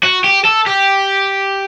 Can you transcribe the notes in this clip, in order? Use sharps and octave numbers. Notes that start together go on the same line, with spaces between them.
F#4
G4
A4
G4